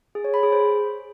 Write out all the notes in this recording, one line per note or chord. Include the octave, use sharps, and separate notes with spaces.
G#4
C#5
B5
G#4
C5